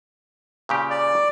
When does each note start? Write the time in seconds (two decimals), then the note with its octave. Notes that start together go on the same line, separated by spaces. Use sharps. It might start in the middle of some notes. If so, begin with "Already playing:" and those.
0.69 A#2 C#3 G4
0.90 D5